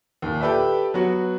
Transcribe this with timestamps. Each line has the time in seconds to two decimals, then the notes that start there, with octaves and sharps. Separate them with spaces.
0.22 D#2 A#2
0.41 G4 A4 B4 D5 E5
0.94 F#3 B3 F#4